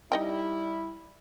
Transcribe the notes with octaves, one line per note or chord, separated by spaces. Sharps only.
G3 D#4 E4 D#5 G5